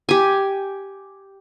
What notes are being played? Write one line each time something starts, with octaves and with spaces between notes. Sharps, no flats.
G4 G#5